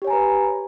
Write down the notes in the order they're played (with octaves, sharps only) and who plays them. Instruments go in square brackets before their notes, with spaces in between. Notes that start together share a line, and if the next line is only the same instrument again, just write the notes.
[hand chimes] G4
C#5
G#5
A#5
B4